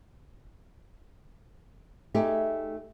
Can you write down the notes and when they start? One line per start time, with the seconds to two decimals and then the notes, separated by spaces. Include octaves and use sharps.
2.14 A3 D#4 G4 G#4